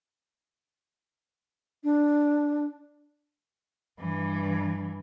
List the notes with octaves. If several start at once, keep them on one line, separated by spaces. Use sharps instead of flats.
D4
G2 E3